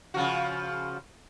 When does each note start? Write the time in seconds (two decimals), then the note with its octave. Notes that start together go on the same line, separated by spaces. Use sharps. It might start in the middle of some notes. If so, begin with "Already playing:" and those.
0.14 C#3 F3 F#4